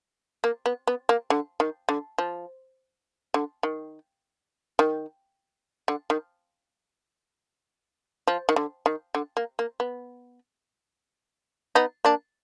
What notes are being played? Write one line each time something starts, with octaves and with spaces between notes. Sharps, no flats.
A#3
B3
B3
A#3
D3
D#3
D3
F3
D3
D#3
D#3
D3
D#3
F3
D#3
D3
D#3
D3
A#3
A#3
B3
B3 D#4
A#3 D4